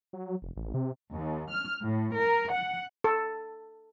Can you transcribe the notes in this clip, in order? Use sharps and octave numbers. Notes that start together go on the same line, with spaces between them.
F#3
F1
A1
C3
D#2
F6
A2
A#4
F#5
A4